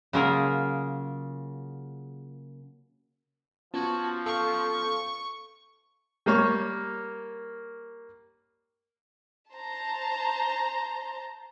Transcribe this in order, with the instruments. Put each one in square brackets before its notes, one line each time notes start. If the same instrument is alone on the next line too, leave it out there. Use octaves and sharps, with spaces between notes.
[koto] C#3 F#3 A#3 F4 G#4 A#4
[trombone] F3 [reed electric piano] B3 C#4 F4 [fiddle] F#4 [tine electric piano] A5 G#6
[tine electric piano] A4 F5 [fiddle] C#6
[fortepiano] G3 A#3 C#5 C#6
[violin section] C5 A5 A#5